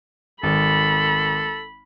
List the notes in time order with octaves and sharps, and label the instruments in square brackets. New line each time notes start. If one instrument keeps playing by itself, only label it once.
[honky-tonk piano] G#1 [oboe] A4 [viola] B5